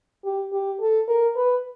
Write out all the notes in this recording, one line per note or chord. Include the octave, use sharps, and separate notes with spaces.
G4
G4
A4
A#4
B4